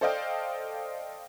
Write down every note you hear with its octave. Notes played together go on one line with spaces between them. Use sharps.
A4 C5 D5 D#5 F5 G5